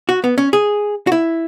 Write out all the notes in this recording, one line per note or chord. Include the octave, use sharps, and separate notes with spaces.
F#4
B3
C#4
G#4
F#4
E4